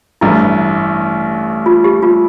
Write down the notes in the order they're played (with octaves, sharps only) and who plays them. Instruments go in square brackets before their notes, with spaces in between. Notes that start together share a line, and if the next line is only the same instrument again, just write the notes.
[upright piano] A1 G2 E3 [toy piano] E4
[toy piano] F4
G4
F4